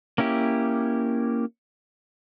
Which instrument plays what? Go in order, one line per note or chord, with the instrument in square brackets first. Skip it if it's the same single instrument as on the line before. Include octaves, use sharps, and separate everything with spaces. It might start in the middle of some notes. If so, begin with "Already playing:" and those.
[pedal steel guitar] A#3 C#4 E4 G4